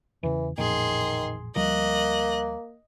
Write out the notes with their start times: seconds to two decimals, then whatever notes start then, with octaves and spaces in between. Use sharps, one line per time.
0.23 E2 C#3 E3
0.58 A1 F2 A#2 D#3 G#4 C6
1.56 D2 F3 G3 A#3 D#5 F#6